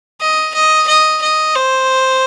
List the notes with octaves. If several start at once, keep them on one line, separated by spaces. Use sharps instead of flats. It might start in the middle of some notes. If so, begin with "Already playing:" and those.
D#5
D#5
D#5
D#5
C5